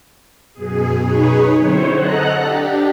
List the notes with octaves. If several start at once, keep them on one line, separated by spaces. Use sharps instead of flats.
F#2 B2 G#4
D#4 G#4 B4 C#5
D3 F#3 C4 E4 C5 C#5
A4 D#5 F#5 A#5 F#6
D4 G4